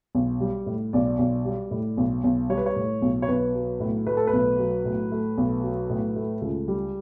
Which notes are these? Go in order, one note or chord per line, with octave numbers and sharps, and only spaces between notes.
B1
G3
A2
B1 D5
B1
G3
A2
B1
B1
G3 C#5
B4
C#5
A2
B1
C#5
B1 B4
F#3
A2
A3 B4
A4
B4
B1
F#3
A2
A3
B1
F#3
A2
A3
C#2
G3